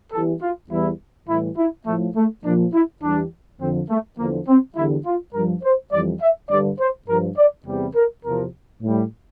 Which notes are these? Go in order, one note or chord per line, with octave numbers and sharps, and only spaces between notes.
E2 E3 G3 A4
F4
E2 E3 G3 E4
A2 E3 G3 E4
E4
A2 F3 A3
A3
A#2 F3 D4
E4
E2 E3 G3 D4
F2 D3 F3 C4
A3
E2 D3 F3 A#3
C4
E2 D3 G3 E4
F4
G2 F3 A#4
C5
F2 E3 G3 D5
E5
G2 D3 G3 D5
C5
G2 F3 A#4
D5
E2 C3 G3
A#4
E2 C3 F3 A#4
A2 G3